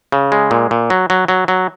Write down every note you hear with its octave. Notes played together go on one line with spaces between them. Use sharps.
C#3
G#3
A#2
A#2
F#3
F#3
F#3
F#3